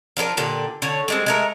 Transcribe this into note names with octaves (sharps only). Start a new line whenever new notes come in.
F3 D4 G4 A#4
A#2 D3 G4
D3 C#5
G3 G#3 C4
G#3 A3 A#4